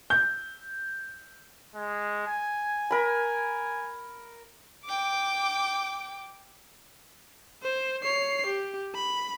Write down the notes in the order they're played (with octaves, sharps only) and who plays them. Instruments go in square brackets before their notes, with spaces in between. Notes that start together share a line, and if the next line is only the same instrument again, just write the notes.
[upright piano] G6
[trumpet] G#3
G#5
[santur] A#4 B5
[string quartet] G5 D6
[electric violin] C5
C#5 C7
G4
B5